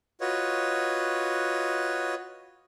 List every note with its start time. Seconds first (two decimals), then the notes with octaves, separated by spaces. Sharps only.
0.21 F4 F#4 B4 C#5 D#5